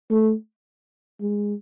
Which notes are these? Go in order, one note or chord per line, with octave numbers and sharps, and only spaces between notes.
A3
G#3